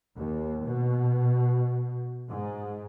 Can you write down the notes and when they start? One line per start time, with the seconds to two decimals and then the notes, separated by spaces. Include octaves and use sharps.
0.17 D#2
0.66 B2
2.30 G#2